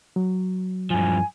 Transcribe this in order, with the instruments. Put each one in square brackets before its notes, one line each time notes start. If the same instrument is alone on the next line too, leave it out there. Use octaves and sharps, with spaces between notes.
[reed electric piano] F#3
[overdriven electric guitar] G2 F3 [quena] G#5